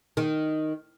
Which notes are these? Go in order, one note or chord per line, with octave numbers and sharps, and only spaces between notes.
D#3